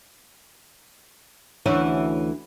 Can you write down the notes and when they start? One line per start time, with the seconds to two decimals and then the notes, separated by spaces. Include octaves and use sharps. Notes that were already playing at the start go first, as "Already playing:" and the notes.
1.66 D2 E3 C#4